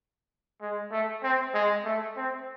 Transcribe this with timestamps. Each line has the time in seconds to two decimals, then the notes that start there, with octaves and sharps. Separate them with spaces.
0.61 G#3
0.91 A3
1.23 C4
1.54 G#3
1.85 A3
2.17 C4